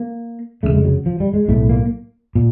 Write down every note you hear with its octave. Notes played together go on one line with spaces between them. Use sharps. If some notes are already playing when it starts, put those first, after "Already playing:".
Already playing: A#3
F1 F2 C#3 A3
G#3
F#3
F3
G3
G#3
B1 A2 A3
A#3
A#2